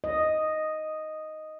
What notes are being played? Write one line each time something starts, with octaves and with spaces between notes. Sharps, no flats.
D#5